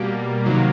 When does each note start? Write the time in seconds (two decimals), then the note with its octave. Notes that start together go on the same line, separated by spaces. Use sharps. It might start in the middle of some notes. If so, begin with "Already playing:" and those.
Already playing: B2 G3 A#3
0.45 C3 D#3 F#3 A#3